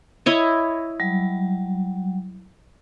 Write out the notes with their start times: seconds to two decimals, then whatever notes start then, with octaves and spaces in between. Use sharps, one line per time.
0.26 E4 C#5 D#5
1.00 F#3 G3